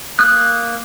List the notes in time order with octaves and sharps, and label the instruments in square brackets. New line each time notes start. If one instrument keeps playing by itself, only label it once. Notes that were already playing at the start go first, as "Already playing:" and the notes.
[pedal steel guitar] A#3 D#6 F#6